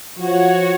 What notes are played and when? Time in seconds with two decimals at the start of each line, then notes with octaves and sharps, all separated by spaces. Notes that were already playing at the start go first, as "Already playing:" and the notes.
0.19 F3 F#4 C#5 F#5